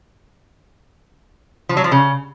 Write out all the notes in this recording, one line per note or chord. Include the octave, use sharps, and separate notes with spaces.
F3
F#3
F3
C#3